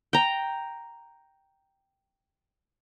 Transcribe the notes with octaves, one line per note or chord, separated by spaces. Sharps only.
G5 A#5